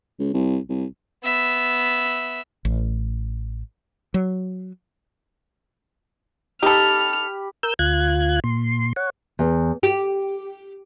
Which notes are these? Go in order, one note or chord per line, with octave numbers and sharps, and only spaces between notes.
C#2
C2
C2
B3 E5
A1
F#3
D#4 G4 A4 B5 F6
A#4 E6 G6
D2 F4 F#6 G#6
A#2 C6
C#5 F#5
E2
G4